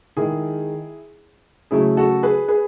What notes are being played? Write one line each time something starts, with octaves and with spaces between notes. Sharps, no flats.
D#3 G#3 E4 G#4
C#3 F#3 A3 E4 G#4
F#4 A4
G#4 B4
G#4 B4